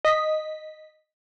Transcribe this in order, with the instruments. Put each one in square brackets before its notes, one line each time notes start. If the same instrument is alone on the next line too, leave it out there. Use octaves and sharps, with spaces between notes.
[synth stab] D#5 B6